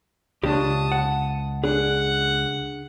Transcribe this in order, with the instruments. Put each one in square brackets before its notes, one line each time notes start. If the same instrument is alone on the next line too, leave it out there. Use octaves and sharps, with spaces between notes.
[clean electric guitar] C#2 [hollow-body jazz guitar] C#3 D4 G4 [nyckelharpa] A5 D#6
[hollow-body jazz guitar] F#5
[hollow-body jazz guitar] D4 G#4 [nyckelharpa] F#5